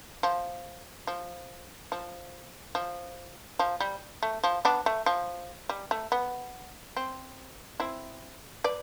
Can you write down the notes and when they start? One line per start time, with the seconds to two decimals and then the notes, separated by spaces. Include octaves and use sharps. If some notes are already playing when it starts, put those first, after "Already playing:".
0.23 F3
1.07 F3
1.92 F3
2.75 F3
3.59 F3
3.80 G3
4.23 A3
4.44 F3
4.65 B3 D4
4.86 A3
5.06 F3
5.69 G3
5.91 A3
6.12 B3
6.96 C4
7.80 C4 E4
8.64 B4 D5